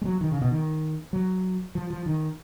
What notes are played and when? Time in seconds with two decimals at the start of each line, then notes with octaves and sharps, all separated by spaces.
0.01 G#3
0.05 F#3
0.21 D#3
0.32 C#3
0.41 B2
0.51 D#3
1.13 F#3
1.75 F3
1.90 F3
2.06 D#3